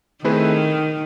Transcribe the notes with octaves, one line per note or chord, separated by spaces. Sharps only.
D#3 A3 C4 E4 G#4 B4